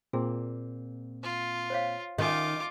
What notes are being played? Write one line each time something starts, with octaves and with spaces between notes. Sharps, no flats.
A#2 A#3 C4 G#4
F4
C5 C#5 F5
D#3 C#4 F4 G#5 D6